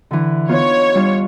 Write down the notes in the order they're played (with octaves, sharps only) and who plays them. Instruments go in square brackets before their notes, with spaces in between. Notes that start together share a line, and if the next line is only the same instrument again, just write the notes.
[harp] D3 E3
[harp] B3 D#4 F4 [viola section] C#5
[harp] G3 D4 F4